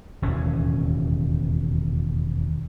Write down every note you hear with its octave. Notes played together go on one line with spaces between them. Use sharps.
E1 D#2 A2 C#4